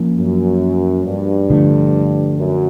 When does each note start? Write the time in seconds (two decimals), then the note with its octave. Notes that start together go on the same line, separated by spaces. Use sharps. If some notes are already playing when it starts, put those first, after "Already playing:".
Already playing: F3 A#3 C#4
0.18 F#2
1.06 G2
1.50 D3 F3 A3
2.38 F#2